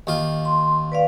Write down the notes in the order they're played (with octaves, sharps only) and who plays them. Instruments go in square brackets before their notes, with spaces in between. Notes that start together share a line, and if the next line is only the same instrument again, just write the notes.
[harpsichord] D#2 F4
[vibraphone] C6
B4 D5 F5